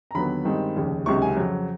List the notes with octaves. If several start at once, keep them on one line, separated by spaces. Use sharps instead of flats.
A#5
D#2 D3 F#3 B3 B5
G2 D#3 G#3 C4
F1 D#2 C#3
C#2 C3 D#3 F#3 C#6
G#5
F2 C#3 F#3